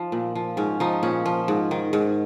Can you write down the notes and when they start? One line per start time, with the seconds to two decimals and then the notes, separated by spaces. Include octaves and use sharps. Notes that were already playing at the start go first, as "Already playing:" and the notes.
Already playing: F3 D#4
0.12 A#2
0.35 F3
0.57 G#2 C#4
0.80 F3 D#4
1.03 A#2 C#4
1.26 F3
1.48 G#2
1.71 D#3
1.93 G#2